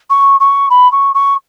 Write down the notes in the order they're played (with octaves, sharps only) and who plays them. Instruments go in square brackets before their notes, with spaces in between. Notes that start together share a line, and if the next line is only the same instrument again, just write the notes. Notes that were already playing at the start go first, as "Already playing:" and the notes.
[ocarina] C#6
C#6
B5
C#6
C#6